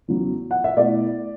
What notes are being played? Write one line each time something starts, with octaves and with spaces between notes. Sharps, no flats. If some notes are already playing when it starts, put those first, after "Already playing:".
E2 C#3 F#3
F#5
E5
B2 A3 E4 D5